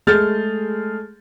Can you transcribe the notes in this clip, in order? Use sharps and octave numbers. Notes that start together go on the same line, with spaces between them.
G#3 A3 G#4 F6 G6 A6